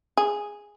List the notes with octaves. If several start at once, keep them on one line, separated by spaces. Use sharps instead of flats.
G#4